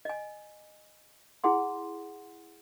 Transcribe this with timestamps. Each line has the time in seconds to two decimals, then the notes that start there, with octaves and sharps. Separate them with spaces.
0.05 D#5 G#5
1.44 E4 G#4 F#5 C6